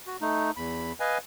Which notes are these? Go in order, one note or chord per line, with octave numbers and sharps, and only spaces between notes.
F#4
A3 D#4
E2 B5
B4 D#5 F5 G#5